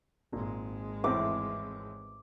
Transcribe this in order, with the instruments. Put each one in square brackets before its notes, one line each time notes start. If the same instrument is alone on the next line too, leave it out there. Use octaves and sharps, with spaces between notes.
[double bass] G#1 G#3 [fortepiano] A#2
[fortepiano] E2 A2 C4 [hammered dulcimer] D6